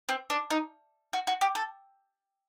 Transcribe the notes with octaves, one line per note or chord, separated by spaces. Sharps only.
C4
D4
D#4
F#4
F#4
G4
A4